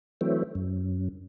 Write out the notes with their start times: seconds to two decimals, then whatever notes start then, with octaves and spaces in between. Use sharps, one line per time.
0.21 E3 F#3 A3 C4
0.55 F#2